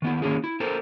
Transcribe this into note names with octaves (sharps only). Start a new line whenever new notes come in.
D#3 B3 E4
D#3 E3 A#3 C#4 E4 G#4
E4
C4 A4 A#4 C5